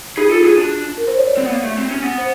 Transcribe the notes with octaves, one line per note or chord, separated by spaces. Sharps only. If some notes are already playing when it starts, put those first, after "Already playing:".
D#4 G#4
F4
A4
F4
G#4
F#4
D4
A#4
C5
C#5
D5
C4
B3
A#3
A3
C4
C#4
B3
C5